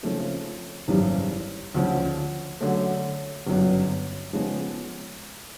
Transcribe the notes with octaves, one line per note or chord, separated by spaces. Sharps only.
C#3 F3 A3 C4
G#1 F#2 C#3 E3 G3
D2 C#3 F3
D3 F#3 A3 C#4
G1 F#2 C#3 F#3 B3
C#3 F3 G#3 B3